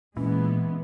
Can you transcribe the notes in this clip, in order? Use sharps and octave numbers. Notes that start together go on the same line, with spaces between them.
A#2 E3 G#3 B3 C#4